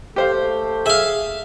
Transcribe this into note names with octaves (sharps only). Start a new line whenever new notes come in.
A3 G4 C5 F5
G#4 E5 F5